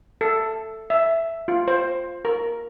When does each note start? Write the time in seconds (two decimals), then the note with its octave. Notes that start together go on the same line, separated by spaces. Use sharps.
0.21 A4
0.90 E5
1.48 F4
1.68 C5
2.25 A#4